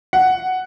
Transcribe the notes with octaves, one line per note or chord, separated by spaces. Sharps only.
F#5